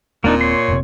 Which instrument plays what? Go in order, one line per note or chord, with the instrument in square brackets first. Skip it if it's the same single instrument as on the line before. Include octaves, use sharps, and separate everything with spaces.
[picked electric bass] D#1 C4 [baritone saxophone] A#2 [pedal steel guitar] A#3 D4 D#4
[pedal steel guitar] C#5 C6
[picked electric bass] F1 C3